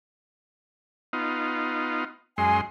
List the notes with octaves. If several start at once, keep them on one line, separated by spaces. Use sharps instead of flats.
B3 D#4 F4
F#2 G#3 G#5 C6